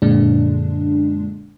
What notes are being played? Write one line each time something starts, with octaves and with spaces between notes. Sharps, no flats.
F#2 A#2 D3 G#3 D4